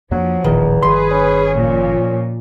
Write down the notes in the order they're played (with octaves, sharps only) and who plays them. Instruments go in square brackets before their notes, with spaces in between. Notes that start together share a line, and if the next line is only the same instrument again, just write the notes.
[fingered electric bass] F2 A#3 D4 [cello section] F3 [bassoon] F#3
[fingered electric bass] E1 A1 A#2 [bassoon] E2 [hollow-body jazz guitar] D#3
[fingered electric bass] G1 D#3 [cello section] G#4 B4 [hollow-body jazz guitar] C6
[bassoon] C#4
[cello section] A#2 F3